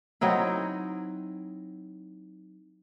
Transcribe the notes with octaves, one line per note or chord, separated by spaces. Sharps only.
F#3 C4 D#4 E4